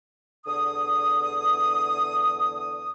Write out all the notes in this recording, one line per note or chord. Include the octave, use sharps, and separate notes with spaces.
E2 D3 D#6